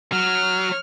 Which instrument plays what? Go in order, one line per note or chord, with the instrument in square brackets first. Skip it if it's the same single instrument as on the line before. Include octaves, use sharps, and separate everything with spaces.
[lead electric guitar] F#3 [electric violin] F6